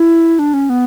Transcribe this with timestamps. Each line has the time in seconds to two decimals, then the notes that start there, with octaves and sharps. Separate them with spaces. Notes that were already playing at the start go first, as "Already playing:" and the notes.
Already playing: E4
0.39 D4
0.54 C#4
0.70 B3